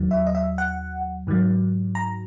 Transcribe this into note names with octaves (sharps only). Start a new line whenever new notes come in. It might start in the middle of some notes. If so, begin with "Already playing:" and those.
Already playing: D#2 D#3 F#3
E5
D#5
E5
F#5
G#2 D#3 F#3
A#5